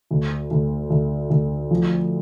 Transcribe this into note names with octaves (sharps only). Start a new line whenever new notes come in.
D2
D2
D2
D2
F3